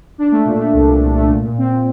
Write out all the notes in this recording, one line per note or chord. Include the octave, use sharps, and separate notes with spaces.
D4
A3
A#2
A3
C2
A#2
C2
A3
A#2
A#2
C4
A#2